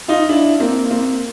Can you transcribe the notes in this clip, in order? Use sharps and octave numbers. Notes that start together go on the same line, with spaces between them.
D#4 F4
D4 E4
A#3 C4
A#3 C4